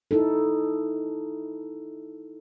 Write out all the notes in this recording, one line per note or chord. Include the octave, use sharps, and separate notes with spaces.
D#4 E4 A4